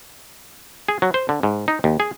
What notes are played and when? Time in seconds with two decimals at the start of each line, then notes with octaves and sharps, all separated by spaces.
0.88 G#4
1.02 F#3
1.14 C5
1.29 D3
1.43 G#2
1.68 D#4
1.84 D#2
2.00 G#4